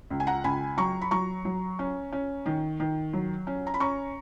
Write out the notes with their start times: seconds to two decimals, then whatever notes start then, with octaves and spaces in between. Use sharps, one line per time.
0.10 C#2
0.20 G#5
0.27 F#5 A#5
0.44 C#2 G#5 B5
0.77 F#3 A#5 C#6
1.02 B5
1.11 F#3 A#5 C#6
1.45 F#3
1.79 C#4
2.12 C#4
2.46 D#3
2.80 D#3
3.13 F#3
3.47 C#4
3.67 A#5
3.74 B5
3.80 C#4 A#5 C#6